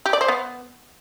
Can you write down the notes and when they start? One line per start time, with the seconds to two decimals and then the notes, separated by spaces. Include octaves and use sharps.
0.06 G4
0.13 D5
0.21 C5
0.28 B3